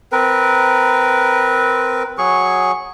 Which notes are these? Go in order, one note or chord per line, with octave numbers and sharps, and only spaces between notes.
C4 A#4 B4
F#3 G#4 C#6